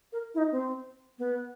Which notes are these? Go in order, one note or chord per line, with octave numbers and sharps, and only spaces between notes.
A#4
E4
D#4
C4
B3